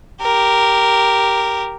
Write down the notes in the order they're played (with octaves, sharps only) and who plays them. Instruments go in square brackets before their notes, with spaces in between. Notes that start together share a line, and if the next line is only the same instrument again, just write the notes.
[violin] G4 A#4